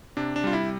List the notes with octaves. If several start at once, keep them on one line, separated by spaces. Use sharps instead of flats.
C3 D4
D4
G3 F4
E4